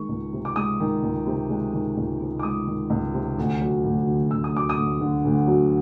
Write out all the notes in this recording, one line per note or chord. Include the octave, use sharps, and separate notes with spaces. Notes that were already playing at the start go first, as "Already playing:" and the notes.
Already playing: D#3 G#3 C#6
C#2
C3
D6
G#3 D#6
D#3
C#2
C3
G#3
D#3
C#2
C3
D6
G#3 D#6
D#3
C#2
C3
D2
F#3
D2
D3
D2 E6
D#6
F#3 D6
D#6
D2
D3
D2
F#3